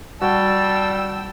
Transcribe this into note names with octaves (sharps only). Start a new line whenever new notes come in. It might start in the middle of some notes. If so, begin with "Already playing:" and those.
G3 F#4 G5 A5 E6